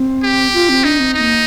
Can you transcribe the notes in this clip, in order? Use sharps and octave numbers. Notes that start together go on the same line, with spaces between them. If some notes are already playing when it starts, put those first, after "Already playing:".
Already playing: C4
G4
F4
C4
D4 D#4
C4
C4 D#4
A#3